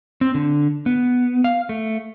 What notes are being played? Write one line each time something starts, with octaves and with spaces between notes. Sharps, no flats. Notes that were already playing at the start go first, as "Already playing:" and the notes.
C4
D3
B3
F5
A3